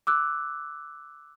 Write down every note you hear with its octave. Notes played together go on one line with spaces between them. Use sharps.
D6 E6 F#6